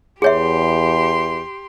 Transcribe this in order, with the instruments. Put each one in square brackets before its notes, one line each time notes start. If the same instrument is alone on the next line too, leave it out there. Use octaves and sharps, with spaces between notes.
[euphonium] E2 [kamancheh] G4 C6 [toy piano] G#4 C#5 E5